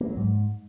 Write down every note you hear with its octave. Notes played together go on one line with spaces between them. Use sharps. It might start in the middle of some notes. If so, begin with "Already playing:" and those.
A#3
F#3
G#2